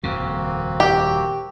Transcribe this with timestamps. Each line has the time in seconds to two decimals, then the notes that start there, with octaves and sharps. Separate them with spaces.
0.03 D#1 F2 C#3 A#3 C4 F#4
0.80 G4